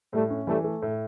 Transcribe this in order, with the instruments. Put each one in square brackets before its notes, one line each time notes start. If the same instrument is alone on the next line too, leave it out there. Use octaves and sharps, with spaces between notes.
[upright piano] A2 [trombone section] G3 A3
[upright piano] C#4
[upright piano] E3 [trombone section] G3 A3
[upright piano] A3
A2